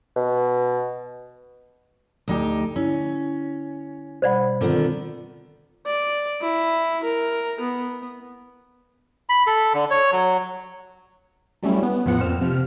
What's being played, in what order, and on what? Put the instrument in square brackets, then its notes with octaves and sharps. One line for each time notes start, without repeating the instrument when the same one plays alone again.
[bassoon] B2
[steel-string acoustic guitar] D2 D#4 G4
[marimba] D3 E4 [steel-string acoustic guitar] C#4
[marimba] B2 G3 B5 [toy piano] C5 D5 F#5
[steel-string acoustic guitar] D3 D#3 B3 [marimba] C4 F4
[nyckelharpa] D5
E4
A#4
B3
[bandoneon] B5
A4
D3
C#5
F#3
[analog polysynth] F#3 G3 A3 C#4 E4
B3
E2 A2 F3 B3 F#5 C#7
F2 A#2 C4 F6 E7
C3 F3 F6